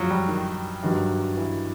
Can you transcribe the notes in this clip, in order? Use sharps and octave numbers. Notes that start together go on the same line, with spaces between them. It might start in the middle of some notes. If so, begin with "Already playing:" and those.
Already playing: F#2 F3 F#3
G3
D#3
G2 D#3 F#3
E3